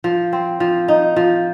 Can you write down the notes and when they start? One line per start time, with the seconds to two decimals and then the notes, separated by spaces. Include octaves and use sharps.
0.04 F3
0.33 C4
0.60 F3
0.88 D#4
1.16 F3